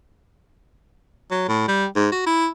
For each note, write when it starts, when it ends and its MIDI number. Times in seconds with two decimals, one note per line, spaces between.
1.31 1.44 54
1.48 1.63 45
1.68 1.86 55
1.96 2.09 44
2.12 2.25 66
2.26 2.48 64